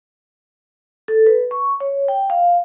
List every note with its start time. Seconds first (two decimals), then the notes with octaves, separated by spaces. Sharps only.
1.08 A4
1.27 B4
1.51 C#6
1.80 C#5
2.08 G5
2.30 F5